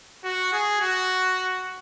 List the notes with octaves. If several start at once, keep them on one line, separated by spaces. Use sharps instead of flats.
F#4
G#4
F#4